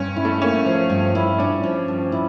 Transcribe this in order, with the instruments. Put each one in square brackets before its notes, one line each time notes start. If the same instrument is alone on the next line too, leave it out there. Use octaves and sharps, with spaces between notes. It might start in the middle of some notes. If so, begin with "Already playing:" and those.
Already playing: [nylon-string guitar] G2 [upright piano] C#4
[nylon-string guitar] E4
[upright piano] A3
[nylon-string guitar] A#3 [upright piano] C#4
[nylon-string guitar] F3
G2
E4
[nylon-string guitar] C#4 [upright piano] D4
[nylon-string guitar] F3
G2
E4